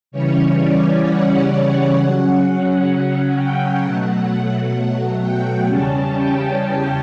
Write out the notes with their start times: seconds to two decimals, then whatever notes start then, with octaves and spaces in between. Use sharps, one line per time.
0.11 C#3 E3 G3 C#4 C#5
0.58 D5
1.04 F#5
1.97 C#3 F#3 C#4
2.43 F#5
3.35 G5
3.82 B2 F#3 A3 F#5
5.21 G5
5.67 E2 C#3 G3 C#4 A5
6.13 G5